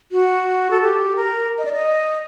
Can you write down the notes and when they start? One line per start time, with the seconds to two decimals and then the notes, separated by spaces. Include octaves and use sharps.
0.12 F#4
0.71 A4
0.82 G4
1.16 A#4
1.58 D#5
1.65 D5
1.73 D#5